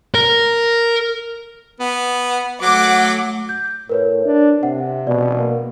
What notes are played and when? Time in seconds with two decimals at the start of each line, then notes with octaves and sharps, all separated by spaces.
0.14 A#4
1.80 B3
2.62 F#3 A3 F#5 D6
3.49 G6
3.89 A2 A#4 B4 C#5
4.25 D4
4.63 C3 F#5
5.07 B2 D5
5.38 A#3